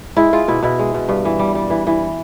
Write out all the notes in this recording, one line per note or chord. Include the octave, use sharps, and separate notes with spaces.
G#3 E4
G#3 F4
B2 E4
B2 E4
G#3
B2
G2
E3
G3
G3
E3
E3